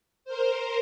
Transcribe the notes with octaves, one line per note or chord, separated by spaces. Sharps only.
A#4 C5